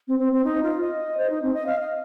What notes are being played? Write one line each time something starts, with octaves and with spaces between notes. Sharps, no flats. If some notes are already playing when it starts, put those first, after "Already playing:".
C4
C4
C4
D#4
F4
D#5
C5
D#4
C4
D#5
F5
D#5